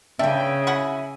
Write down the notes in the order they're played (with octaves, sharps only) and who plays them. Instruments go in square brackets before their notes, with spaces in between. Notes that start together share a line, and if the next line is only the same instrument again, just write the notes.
[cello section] C#3 [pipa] E3 D4 [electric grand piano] E5 [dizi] G5
[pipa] E4 F#4 F#5 [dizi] G#5